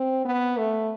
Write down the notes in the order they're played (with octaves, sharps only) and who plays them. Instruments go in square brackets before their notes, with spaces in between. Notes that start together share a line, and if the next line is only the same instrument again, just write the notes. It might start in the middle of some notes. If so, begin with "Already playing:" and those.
Already playing: [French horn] C4
B3
A3